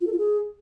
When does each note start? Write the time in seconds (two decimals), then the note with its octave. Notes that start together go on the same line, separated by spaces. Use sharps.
0.01 F4
0.07 A4
0.13 F4
0.18 G#4